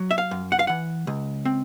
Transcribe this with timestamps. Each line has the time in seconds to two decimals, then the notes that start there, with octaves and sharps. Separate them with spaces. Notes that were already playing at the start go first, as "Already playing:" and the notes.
Already playing: F#3
0.11 E5
0.18 F5
0.31 F#2
0.52 F#5
0.59 F5
0.67 E3 F#5
1.07 C#2
1.45 C4